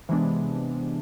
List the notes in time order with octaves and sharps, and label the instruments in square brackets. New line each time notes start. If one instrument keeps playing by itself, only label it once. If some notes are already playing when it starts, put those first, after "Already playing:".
[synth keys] C3 E3 G#3 B3 D4